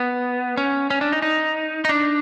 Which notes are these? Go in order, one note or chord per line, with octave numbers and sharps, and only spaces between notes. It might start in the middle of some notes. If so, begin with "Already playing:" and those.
Already playing: B3
C#4
C#4
D4
D#4
D#4
D#4
D4